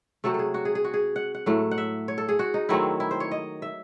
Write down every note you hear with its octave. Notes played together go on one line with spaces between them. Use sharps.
C3 F#3 A3 A4
G#4 A4
F#4
G#4
G#4
F#4
G#4
F#5
F#5
A2 F#3 A3
F#5
E5
C#5
A4
G#4
F#4
D#4
D#3 F#3 A3 C4 E4
E4
C5
C#5
D#5
E5